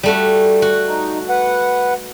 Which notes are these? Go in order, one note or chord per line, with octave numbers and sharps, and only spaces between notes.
G3 A3 F#4
F#4
D#4
B4 F#5